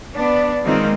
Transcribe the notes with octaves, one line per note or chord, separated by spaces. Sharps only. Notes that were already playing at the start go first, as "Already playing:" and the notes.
B3 D4
D#3 G#3 A#3 C4 D#4 F4